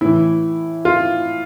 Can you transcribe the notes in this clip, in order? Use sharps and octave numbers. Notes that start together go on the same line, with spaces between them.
A2 E3 E4
F4